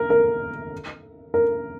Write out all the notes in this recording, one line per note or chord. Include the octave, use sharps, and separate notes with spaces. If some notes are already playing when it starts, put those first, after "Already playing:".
Already playing: A#4
A#4
A#4